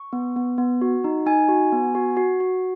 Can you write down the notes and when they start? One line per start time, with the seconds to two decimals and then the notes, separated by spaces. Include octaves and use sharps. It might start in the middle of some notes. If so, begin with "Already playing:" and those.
Already playing: C#6
0.13 B3
0.36 B3
0.58 B3
0.81 F#4
1.04 D#4
1.26 D#4 G#5
1.49 F#4
1.72 B3
1.95 F#4
2.17 F#4
2.40 F#4